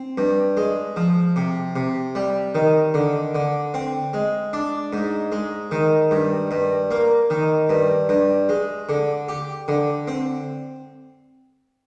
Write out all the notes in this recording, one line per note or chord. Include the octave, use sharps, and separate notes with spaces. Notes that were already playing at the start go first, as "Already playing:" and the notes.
Already playing: C4
G2
G#3
F3
C3
C3
G3
D#3
D3
D3
C4
G#3
D4
G#2
G#3
D#3
G2
G2
A#3
D#3
G2
G2
G#3
D3
G4
D3
C4